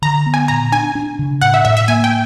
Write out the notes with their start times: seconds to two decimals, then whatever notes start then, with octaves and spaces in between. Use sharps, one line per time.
0.02 D3 A#5
0.26 B3
0.34 G#5
0.48 A#2 A#5
0.72 D4 G#5
0.95 D4
1.19 C#3
1.41 A2 F#5
1.54 E5
1.65 A2 E5
1.77 E5
1.88 A#3 G#5
2.04 G5